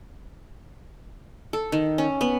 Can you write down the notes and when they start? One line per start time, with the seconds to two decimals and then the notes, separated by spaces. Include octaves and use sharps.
1.53 A4
1.72 D#3
1.98 C#4
2.21 B3